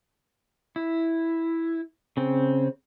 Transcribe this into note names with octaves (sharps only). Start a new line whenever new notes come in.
E4
C#3 C4